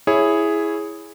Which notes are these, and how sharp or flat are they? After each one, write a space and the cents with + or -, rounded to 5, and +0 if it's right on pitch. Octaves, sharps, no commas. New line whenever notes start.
E4 +0 G#4 +0 C#5 +0